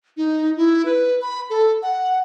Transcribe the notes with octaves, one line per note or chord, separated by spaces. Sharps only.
D#4
E4
B4
B5
A4
F#5